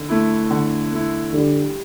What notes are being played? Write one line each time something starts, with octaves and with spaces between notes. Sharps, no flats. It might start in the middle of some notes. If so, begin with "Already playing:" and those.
Already playing: D3
A3 E4
D3
A3 E4
D3 G3